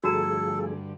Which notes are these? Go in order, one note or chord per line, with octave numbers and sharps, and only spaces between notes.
G2 D3 F3 A3 F#4 G#4 A4 A#5